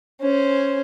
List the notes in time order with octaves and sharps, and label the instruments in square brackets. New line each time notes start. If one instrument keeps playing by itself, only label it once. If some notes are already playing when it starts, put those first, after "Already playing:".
[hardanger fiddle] C#4 C5